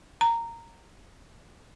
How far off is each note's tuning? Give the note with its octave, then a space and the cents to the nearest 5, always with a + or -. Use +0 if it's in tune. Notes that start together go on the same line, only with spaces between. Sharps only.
A#5 -10